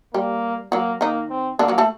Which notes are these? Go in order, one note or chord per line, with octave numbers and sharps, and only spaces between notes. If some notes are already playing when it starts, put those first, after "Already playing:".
G3 A#3 G4
F#3 A#3 F#4
D#3 A#3 D#4
C4
D3 A#3 D4
F#3 F#4
A3 A4